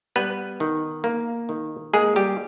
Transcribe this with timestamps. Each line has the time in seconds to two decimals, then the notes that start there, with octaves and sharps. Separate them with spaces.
0.16 G3 B3 B4
0.60 D#3
1.04 A#3
1.49 D#3
1.93 G#3 A#3 G#4
2.16 G3 G4